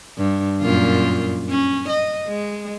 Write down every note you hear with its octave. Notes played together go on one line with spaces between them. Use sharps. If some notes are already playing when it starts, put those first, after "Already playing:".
G2
F#2 A#2 F4
C#4
D#5
G#3